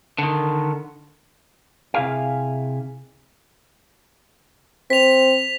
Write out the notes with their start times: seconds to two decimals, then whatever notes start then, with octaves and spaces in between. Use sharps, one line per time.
0.18 D3 D#3
1.94 C3 E4 G#4 F5
4.90 C4 B6 F7